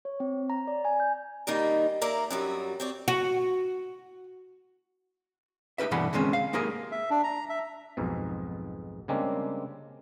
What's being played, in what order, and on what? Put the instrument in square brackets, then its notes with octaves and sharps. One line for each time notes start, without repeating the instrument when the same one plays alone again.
[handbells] C#5
C4
A#5
D5
G#5
G6
[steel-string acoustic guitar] D#3 G3 A#3 D#4
A#3 A#4 D5 E5
F#2 F#3 G3
C4 C#5 D5
[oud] F#4
[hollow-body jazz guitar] D#4 G4 A#4 B4 E5
G2 B2 D3 E3 F#5 B5
D3 D#3 G#3 C4 C#4
F5
G#3 A#3 D#4 G4 G#4 A#4
[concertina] E5
D4
A#5
E5
[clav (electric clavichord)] B1 F2 G#2 B2
C#3 G3 G#3 A#3 C4 D4